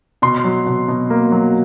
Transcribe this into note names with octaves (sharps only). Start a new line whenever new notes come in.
B2 C6
F#3
B2
B2
A#3
F#3